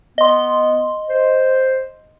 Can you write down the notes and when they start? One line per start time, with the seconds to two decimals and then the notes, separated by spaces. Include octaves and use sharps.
0.18 B3 D#5 C6
1.09 C5